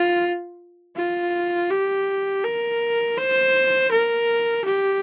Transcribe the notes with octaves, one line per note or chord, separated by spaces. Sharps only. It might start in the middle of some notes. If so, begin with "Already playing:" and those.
Already playing: F4
F4
G4
A#4
C5
A#4
G4